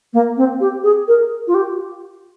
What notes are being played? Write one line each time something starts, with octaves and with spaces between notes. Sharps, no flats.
A#3
C4
G4
G#4
A#4
F4
G4